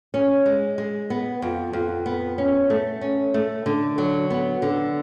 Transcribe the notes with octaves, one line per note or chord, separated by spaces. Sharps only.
C#4
G#3
G#3
B3
F2
F2
B3
C#4
A3
C#4
A3
D3
F#3
B3
D3